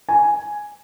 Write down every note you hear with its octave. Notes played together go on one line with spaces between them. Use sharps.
G#5